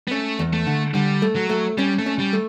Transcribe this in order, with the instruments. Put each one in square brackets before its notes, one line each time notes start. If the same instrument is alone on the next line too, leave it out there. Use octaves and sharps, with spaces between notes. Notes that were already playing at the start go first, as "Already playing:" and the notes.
[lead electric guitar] B3
[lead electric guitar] A3 [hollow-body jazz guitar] C#4
[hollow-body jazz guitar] E2
[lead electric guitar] A3
[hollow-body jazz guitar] D3
[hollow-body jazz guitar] D3 [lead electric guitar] G3
[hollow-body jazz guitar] A3
[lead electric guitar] F#3
[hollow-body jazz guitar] A3
[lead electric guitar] G3 [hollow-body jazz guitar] C#4
[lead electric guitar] A3
[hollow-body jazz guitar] C#4
[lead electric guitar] G3
[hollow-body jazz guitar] A3